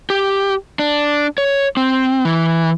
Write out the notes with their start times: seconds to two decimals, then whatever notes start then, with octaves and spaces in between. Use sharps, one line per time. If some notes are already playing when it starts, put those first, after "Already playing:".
0.10 G4
0.79 D4
1.38 C#5
1.77 C4
2.25 E3